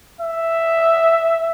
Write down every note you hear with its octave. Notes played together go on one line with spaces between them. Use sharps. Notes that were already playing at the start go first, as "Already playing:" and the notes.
E5